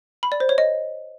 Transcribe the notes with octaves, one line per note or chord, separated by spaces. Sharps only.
B5
D5
C5
C#5
D#5